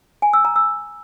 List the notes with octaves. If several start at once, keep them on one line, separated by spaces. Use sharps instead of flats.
G#5
E6
A#5
E6